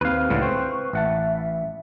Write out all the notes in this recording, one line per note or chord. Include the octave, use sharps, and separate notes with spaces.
D#2 C4 B4 F5
C#2 A2 D3
C4 C5 C#6
A1 E5 F#5 A5